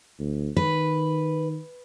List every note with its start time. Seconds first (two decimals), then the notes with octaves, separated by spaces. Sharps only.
0.19 D2
0.56 D#3 B4